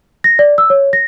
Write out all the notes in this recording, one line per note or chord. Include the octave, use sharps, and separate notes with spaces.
A#6
D5
E6
C#5
A#6